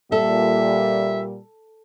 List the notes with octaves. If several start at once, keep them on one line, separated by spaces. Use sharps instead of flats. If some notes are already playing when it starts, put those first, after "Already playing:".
A#2 G3 A4 E5